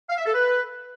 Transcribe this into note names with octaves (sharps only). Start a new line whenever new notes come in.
F5
E5
A4
B4